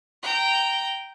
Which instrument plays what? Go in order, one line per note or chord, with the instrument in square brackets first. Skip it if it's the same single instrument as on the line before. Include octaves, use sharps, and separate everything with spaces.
[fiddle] G5 A#5